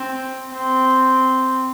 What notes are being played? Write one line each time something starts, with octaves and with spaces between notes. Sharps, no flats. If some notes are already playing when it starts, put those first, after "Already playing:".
Already playing: C4
C4